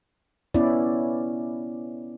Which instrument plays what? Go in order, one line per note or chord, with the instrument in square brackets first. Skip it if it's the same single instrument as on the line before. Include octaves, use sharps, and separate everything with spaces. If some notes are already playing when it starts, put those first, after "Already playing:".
[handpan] B3 C#4 E4 D5